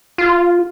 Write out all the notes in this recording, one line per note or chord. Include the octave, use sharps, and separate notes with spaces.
F4